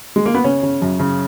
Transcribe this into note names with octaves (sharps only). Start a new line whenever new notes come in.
G#3
A#3
B3
C#3 C#4
C#3
F#2
C#3